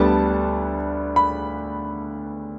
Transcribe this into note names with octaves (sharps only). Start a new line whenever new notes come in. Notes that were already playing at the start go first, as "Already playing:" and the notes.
Already playing: D2 D3 G3 B3 A5
B5